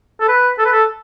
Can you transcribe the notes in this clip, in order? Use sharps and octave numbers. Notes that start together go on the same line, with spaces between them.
A4
B4
A4
B4
A4